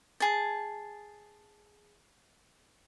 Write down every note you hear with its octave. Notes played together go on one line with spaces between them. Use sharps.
G#4 A5